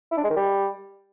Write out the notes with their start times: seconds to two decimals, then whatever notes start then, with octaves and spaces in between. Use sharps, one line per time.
0.11 E4
0.17 D4
0.24 G#3
0.30 D#3
0.36 G3